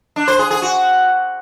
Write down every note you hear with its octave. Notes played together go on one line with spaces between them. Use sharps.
D4
C5
G#4
G#4
F#4